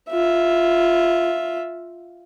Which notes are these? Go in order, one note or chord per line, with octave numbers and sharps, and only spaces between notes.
F4 E5